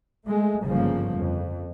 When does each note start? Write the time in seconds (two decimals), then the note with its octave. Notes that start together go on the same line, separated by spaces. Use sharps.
0.24 G#3 A3
0.63 G1 G#2 C#3 F3 A#3
1.17 F2